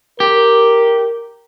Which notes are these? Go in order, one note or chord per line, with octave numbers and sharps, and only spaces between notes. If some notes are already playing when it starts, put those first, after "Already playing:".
G4 A#4